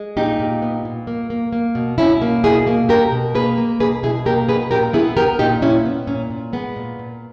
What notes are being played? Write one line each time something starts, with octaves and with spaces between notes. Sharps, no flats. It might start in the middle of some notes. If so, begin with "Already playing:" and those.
Already playing: G#3
A#2 D#4 G4
A#2
B3
A#2
A#3
A#3
A#3
B2
B2 C#4 E4
A#3
B2 E4 G#4
A#3
B2 G4 A#4
B2
A#3 G#4 B4
A#3
B2 G#4 B4
B2 E4 G#4
A#3 G4 A#4
B2 G#4 B4
A#2 G4 A#4
B3 E4 G#4
B3 G4 A#4
A#2 D#4 G4
A#2 C#4 E4
B3
A#2 C#4
A#2
G#3 B3
A#2
A#2